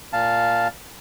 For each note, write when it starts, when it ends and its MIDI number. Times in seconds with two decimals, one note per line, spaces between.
0.13 0.68 46
0.13 0.68 77
0.13 0.68 81